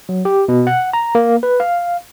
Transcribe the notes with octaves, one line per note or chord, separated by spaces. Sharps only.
F#3
G4
B2
F#5
A#5
A#3
B4
F5